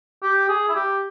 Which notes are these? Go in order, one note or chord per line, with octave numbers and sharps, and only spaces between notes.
G4
G#4
E4
G4